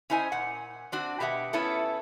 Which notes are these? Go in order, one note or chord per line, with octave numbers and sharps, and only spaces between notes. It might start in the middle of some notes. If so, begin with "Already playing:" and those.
C#4 E4 C5 D#5 G#5
A#2 F#5
C4 D4 F#4
B2 G4 B4 E5 F#5
B3 C#4 E4 A4